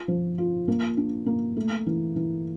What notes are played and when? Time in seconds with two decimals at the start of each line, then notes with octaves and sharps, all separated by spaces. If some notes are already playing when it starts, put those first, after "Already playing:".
Already playing: F4
0.08 F3
0.38 F4
0.68 A#3
0.97 D4
1.26 A#3
1.57 A3
1.86 E3
2.16 E3